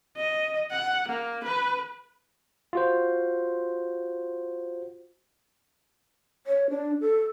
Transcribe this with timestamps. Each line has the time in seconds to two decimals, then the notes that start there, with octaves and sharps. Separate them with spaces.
0.17 D#5
0.71 F#5
1.08 A#3
1.44 B4
2.73 F4 F#4 C5
6.47 C#5
6.70 D4
7.01 A4